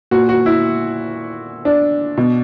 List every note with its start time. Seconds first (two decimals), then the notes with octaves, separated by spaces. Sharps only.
0.11 A#2 F#4
0.29 F#4
0.46 E4
1.65 D4
2.18 B2